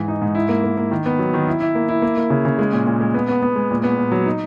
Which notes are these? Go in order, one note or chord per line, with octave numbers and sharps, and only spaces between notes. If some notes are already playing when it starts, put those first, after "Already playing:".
Already playing: G#2 E3
D#4
G#2
E4
A#3
A#3
A#3
D#3
B3
F#3
D#3
E4
E4
A#3
E4
A#3
A#3
C#3
C#3
G#3
A#2
A#2
G#3
B3
B3
B3
G#3
A#2
B3
A#2
F#3
D#4